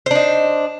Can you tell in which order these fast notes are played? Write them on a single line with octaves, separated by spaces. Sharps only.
C5 D4 D#4